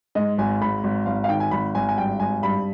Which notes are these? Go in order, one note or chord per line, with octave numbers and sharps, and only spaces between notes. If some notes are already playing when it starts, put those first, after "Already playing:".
G#2 D#5
G#1 G#5
G#2 B5
G#1
G#1 F5
F5
D#3 G5
G#5
G#1 B5
G#1 G#5
G#5
G2 G5
G#1 G#5
G2 B5